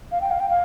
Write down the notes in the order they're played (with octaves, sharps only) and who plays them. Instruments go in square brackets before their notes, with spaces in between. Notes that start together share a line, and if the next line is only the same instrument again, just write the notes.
[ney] F5
G5
F5
G5
F5